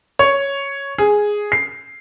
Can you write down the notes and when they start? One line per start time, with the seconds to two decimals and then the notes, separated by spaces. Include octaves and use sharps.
0.19 C#5
0.98 G#4
1.52 C7